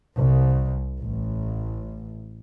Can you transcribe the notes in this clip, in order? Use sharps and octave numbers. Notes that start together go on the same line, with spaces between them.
C2
A1